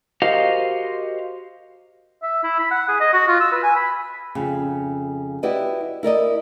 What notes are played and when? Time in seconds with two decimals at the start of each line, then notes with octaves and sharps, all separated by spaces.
0.22 F#4 G4 A#4 C5 D#5 F5
2.22 E5
2.43 E4
2.60 B5
2.71 F#5
2.88 G#4
3.00 D#5
3.13 F#4
3.28 F4
3.40 E6
3.52 B4
3.63 G#5
3.76 B5
4.35 F2 C#3
5.43 E4 F#4 G4 B4 D5 D#5
6.03 E4 A#4 D5 D#5